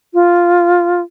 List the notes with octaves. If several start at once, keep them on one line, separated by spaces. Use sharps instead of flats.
F4